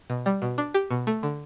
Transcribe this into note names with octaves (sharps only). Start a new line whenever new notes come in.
B2
G3
B2
D4
G4
B2
A3
D3